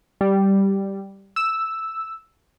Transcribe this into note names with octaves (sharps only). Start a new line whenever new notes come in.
G3
E6